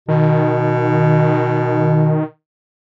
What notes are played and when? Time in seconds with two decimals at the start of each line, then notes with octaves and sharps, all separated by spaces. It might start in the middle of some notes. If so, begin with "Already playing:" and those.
0.08 B2 D#3